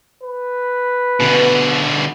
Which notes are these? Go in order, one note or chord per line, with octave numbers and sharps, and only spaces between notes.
B4
B2 D3 E3 B3